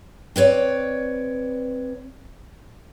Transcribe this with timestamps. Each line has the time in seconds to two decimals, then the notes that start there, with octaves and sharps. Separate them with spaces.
0.36 C4 B4 C#5 D5